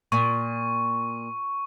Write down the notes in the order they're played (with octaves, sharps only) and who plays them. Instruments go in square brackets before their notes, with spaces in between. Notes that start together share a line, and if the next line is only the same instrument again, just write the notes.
[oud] A#2 [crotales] C#6